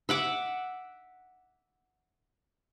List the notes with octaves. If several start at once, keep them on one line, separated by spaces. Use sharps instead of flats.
E5 F#5 D6